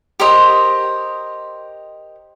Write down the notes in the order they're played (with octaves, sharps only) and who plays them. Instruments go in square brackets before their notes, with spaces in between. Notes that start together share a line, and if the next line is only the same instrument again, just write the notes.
[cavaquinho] G4 A#4 C5 D#5